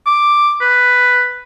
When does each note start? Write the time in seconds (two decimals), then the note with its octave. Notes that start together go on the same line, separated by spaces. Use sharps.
0.06 D6
0.61 B4